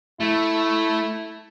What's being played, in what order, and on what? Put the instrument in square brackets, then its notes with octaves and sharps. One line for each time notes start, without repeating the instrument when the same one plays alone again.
[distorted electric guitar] A3 [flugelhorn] E4